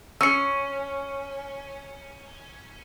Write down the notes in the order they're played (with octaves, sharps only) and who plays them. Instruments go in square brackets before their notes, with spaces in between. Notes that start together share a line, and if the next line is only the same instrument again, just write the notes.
[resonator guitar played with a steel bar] C#4 [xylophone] E6 C#7